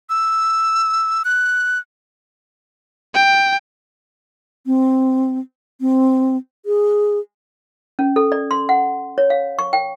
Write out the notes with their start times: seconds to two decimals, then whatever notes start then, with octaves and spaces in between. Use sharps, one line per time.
0.10 E6
1.25 F#6
3.14 G5
4.66 C4
5.81 C4
6.66 G#4
7.99 C#4
8.16 A4
8.32 D5
8.51 C6
8.69 F#5
9.18 C#5
9.30 F5
9.59 C#6
9.73 G5